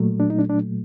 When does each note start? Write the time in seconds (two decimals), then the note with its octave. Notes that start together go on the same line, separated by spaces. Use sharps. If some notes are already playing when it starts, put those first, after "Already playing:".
Already playing: A#2 F#3 A3
0.20 D4
0.30 D#4
0.39 D4
0.49 D4